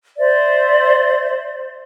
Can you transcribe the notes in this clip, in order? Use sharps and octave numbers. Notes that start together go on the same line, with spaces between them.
C5 D5 E5